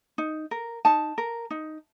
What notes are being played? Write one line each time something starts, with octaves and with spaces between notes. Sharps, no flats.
D#4
A#4
D#4 A5
A#4
D#4